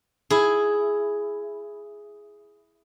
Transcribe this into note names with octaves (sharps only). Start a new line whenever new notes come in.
E4 G#4